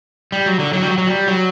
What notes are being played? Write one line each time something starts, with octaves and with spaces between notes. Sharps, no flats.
G3
F#3
D3
F#3
G3
F#3
F#3
G3
F#3